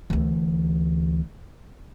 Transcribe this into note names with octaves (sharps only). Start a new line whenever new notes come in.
D2 E3